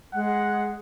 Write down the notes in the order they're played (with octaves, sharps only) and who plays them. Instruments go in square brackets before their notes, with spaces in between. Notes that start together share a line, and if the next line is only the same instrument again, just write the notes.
[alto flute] G#3 [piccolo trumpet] F#5